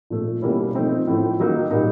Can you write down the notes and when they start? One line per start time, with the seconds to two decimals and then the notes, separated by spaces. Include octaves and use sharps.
0.10 A#2 F3 A3
0.42 B2 G3 A#3 C#4 E4
0.75 F3 A3 C4 D#4
1.07 A2 F3 A3
1.40 D#3 F#3 A#3 D#4
1.71 A#2 G3 A#3 D#4